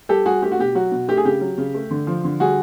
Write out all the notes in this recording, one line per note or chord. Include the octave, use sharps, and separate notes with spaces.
G3 G4 A4
G3 F#4 G#4
A3 G4
F#4
B2 G4
F#3 F#4
B2
A3 G4
G#4
C#3 G4
F#3
C#3
A3
D3
F3
D3
G3 F#4 G#4